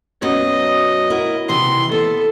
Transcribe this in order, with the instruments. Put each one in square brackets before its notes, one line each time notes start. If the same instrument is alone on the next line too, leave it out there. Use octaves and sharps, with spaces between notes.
[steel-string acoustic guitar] F#2 F#3 B3 [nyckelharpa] D#5
[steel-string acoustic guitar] E4 F#4 A#4
[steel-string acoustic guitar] C3 D#3 E3 [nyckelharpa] C6
[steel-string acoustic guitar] B3 [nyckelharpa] A4